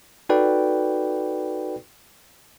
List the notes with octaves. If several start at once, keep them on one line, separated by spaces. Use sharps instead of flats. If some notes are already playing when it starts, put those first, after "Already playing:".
D#4 F#4 A4 B4 D5 G5